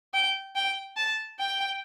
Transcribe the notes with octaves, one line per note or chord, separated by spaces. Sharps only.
G5
G5
A5
G5